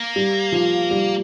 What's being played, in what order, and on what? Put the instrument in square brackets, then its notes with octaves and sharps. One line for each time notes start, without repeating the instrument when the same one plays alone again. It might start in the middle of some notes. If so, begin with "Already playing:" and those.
Already playing: [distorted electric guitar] A#3
[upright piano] G3
F3
G3